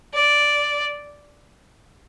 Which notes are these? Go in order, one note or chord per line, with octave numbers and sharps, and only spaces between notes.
D5